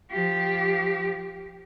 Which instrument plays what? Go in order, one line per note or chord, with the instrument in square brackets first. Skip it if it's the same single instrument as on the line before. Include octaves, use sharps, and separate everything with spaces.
[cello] F3 G4